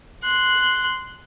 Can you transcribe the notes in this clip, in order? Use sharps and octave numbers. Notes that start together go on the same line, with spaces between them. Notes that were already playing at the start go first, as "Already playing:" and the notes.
C6 F#6